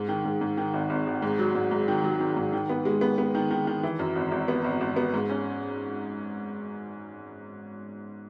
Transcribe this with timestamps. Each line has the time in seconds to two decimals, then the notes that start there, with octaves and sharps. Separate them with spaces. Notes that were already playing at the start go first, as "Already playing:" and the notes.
Already playing: G#2
0.08 D#3
0.25 G#2
0.41 G#2
0.57 D#3
0.74 G#1
0.90 G#1
1.07 G#1
1.22 G#2
1.39 F#3
1.55 G#2
1.71 G#2
1.88 D#3
2.04 F#3
2.20 D#3
2.37 G#2
2.53 D#3
2.69 B3
2.85 G#3
3.01 B3
3.18 B3
3.35 D#3
3.51 D#3
3.67 D#3
3.83 E3
3.99 F#2
4.16 G#1
4.32 G#1
4.48 B3
4.64 G#1
4.81 G#1
4.96 B3
5.14 G#2
5.30 C#4